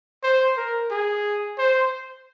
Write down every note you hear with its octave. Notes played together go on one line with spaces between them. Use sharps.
C5
A#4
G#4
C5